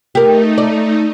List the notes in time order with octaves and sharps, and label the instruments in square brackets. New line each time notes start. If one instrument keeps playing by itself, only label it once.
[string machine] A3 D#4 [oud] G4 A#4
[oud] D5